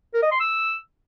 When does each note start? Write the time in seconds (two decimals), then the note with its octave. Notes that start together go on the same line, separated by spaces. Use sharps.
0.14 A#4
0.23 D#5
0.32 C6
0.40 E6